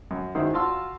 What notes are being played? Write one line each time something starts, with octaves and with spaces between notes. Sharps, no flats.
F#2
D#3 F#3 G#3 E4 C5
F4 F#4 F5 A5 C6 E6